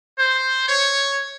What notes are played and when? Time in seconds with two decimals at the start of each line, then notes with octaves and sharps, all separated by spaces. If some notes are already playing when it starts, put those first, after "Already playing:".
0.18 C5
0.67 C#5